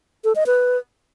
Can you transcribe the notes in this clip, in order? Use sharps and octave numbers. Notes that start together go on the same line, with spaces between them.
A4
D#5
B4